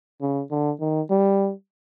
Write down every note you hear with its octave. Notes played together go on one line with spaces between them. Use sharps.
C#3
D3
D#3
G3